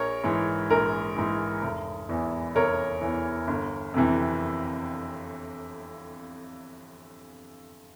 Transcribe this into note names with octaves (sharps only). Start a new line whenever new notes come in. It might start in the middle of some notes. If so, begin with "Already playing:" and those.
Already playing: A#1 A#4 C#5
G#2 E3
A#1 A#4
G#2 E3
F1
E2 E3
F1 A#4 C#5
E2 E3
G1
F2 C3 E3